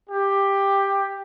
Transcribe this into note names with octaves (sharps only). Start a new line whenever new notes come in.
G4